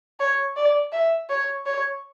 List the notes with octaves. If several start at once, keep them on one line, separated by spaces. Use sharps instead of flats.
C#5
D5
E5
C#5
C#5